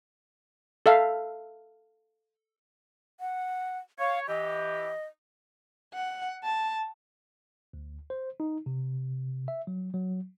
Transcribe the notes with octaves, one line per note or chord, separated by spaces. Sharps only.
A4 E5 F5
F#5
C#5 F5
E3 G4 D#5
F#5
A5
D2
C5
D#4
C3
E5
F#3
F#3